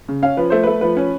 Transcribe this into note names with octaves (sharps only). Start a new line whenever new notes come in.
C#3
C#4 F5
F3 B4
A3 C5
A3 B4
F3 B4
C#4